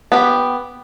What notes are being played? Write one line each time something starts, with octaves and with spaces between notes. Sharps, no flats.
B3 G4